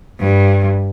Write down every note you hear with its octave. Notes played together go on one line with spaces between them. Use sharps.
G2